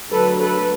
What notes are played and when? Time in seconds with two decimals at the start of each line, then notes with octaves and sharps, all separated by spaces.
0.12 D3 F#3 A3 A4 B4
0.41 A4 B4